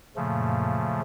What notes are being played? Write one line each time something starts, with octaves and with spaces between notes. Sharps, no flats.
F#2 A#2 C#3 F3 A3